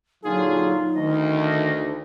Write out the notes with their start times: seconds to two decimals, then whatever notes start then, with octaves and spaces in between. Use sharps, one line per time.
0.24 A#2 D3 F#3 D#4 F4 G#4
0.95 D2 D#3 D#5